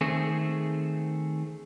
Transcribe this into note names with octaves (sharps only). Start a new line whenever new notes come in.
D#3 A3 C4 G#4